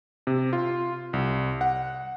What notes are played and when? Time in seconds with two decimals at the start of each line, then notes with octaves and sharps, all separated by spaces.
0.27 C3
0.53 F4
1.13 C2
1.61 F#5